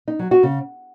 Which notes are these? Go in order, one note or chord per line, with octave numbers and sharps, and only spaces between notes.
D#4
F#3
F#4
C#3